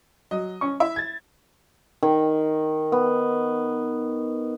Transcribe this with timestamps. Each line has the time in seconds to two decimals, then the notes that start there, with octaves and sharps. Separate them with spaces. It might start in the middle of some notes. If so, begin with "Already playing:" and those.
0.31 F#3 D#5
0.61 C#4 C#6
0.80 E4 E5
0.96 G#6 A6
2.03 D#3
2.92 B3